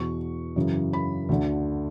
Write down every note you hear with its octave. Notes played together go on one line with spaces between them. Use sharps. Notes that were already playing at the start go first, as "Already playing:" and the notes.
Already playing: E2 B2 C#6
F#2 C#3 E3
B5
D2 D3